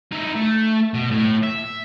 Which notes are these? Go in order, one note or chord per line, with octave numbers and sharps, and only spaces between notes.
D#4 E4
A3
B2
A2
E5